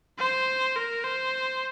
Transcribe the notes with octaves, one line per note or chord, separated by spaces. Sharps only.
C5
A#4
C5